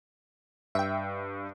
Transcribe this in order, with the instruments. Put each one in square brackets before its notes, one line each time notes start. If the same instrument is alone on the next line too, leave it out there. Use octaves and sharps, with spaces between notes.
[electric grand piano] G2 [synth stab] E5 G5